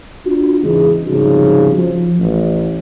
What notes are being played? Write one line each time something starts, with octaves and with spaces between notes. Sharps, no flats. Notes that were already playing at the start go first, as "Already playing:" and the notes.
D4 F4 F#4
E2 G#2 C#3 E3 G#3
C2 G#2 C#3 F3 D#4 F#4
F3
A1